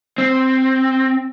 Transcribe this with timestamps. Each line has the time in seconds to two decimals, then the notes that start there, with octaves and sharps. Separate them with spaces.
0.18 C4